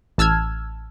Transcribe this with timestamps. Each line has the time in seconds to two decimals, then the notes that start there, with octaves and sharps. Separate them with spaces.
0.18 A1 A5 E6 F6 G#6